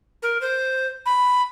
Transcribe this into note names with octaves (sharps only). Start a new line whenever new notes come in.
A#4
C5
B5